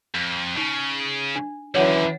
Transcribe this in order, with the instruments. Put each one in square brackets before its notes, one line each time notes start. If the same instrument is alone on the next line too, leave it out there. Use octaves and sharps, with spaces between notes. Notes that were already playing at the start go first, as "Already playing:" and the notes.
[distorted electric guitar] F2
[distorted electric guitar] C#3 [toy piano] D#4
[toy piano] D4
[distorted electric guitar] D#2 D3 [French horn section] E3 F#3 C#4 [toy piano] C#5 F#5